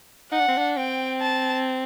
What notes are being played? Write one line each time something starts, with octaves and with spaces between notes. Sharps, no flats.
D#4 F#5
D4
C4
D4
C4 G5
A5